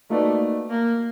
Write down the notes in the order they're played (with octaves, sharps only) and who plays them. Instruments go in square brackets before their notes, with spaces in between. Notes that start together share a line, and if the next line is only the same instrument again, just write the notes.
[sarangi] A3 [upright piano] A#3 D#4 F#4 B4 D5
[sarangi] A#3